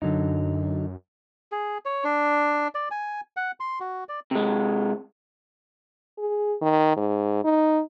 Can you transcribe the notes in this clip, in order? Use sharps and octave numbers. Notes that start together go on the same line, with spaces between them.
F#2 D3 F#3 D#4
G#4
C#5
D4
D5
G#5
F#5
C6
F#4
D5
C3 G#3
G#4
D#3
G#2
D#4